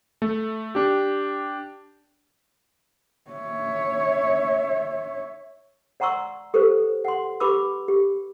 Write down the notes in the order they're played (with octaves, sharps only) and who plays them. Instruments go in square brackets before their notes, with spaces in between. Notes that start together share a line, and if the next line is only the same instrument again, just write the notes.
[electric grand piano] A3
D4 G4
[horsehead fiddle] C#5 E5
[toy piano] D5 F#5 A#5 C6 C#6 E6
G4 A4 B4 C5
F#5 C6
G4 B4 B5 D6 E6
G4